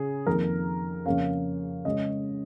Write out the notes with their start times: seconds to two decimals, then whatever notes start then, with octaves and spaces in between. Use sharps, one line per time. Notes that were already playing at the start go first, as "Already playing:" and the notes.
Already playing: C#3 C#4 G#4
0.26 F2 D#3 A#3 A#4
1.06 F2 C#3 A#3 C#4 F5
1.85 C#3 G#3 C#4 D#5